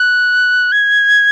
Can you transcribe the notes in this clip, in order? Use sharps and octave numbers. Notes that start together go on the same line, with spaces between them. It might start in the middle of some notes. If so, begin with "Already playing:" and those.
Already playing: F#6
G#6